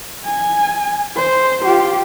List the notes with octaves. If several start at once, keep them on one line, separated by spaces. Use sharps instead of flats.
G#5
C5
F4 G4